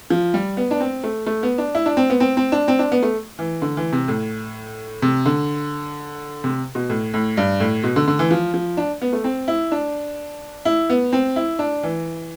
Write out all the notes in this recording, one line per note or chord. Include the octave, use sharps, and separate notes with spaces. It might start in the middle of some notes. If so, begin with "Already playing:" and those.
F3
G3
B3
D4
C4
A3
A3
B3
D4
E4
D4
C4
B3
C4
C4
D4
C4
D4
B3
A3
E3
D3
E3
C3
A2
C3
D3
C3
B2
A2
A2
G2
A2
B2
D3
D3
E3
F3
F3
D4
B3
A3
C4
E4
D4
E4
B3
C4
E4
D4
E3